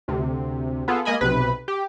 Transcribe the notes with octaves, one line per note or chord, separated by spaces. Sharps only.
D2 C3
B3 F4 G#4 A4
G#3 A#3 D#5 G#5 B5
B1 C3 B4
G4